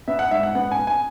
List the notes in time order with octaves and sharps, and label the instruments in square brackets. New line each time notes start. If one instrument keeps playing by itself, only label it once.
[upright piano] B3 E5
F#5
G#2 E5
F#5
B3 F#5
G#5
B3
G#5